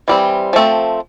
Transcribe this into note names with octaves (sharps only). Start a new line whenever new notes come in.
E3 G3 C4
F3 A3 C4